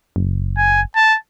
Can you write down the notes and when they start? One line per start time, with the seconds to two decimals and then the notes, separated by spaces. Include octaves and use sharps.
0.16 F#1
0.57 G#5
0.96 A5